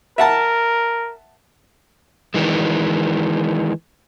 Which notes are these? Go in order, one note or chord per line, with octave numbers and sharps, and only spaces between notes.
A#4 E5 F#5 A5
D#3 E3 G#3